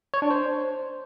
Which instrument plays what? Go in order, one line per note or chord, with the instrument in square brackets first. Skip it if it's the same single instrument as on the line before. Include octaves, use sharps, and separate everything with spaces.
[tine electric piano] C#5
D4
C5